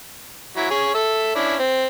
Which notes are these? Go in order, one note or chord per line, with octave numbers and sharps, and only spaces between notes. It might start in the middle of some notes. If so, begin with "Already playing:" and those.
F#3 E4
G#4 C#5
A4 E5
C#4 D4 E4
C4